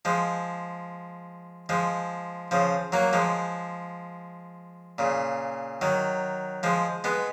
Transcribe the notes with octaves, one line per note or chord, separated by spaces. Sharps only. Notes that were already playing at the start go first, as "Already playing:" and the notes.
F3 G#3
F3 G#3
C#3 F3
F#3 A#3
F3 G#3
A#2 C#3
D#3 F#3
F3 G#3
G#3 B3